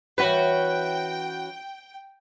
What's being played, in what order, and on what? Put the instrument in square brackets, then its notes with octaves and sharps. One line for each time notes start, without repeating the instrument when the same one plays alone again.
[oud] E3 C#4 C#5 [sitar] F#4 B4 [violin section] G5